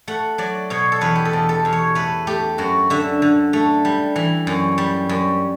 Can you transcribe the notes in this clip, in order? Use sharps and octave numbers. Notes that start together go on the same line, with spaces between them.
A3 F#5
F#3 D5
B2 C#5
A4
E2 B4
G4
A4
E2
A4
E2
C#5
A3 B4
A3 G4
F#2 F#4
D3 E5
D3
A3
G3
E3
F#2
G3
F#2